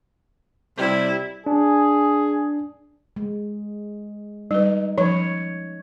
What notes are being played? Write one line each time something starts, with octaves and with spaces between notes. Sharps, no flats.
C3 G3 E4
D4 G#4
G#3
G3 D#4 B4
F3 D#4 C#5